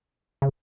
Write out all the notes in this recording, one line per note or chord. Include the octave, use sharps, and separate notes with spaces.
C#3